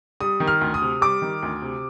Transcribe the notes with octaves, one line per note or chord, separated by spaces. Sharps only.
G3 D#6
D#3
F6
D2
D#6
C3
G3 D6
D#3
D2
C3